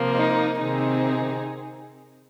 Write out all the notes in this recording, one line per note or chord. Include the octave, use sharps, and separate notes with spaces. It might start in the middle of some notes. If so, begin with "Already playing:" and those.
Already playing: C3 F3 A#3
D#4
C3 D#3 C4 D#4 G#4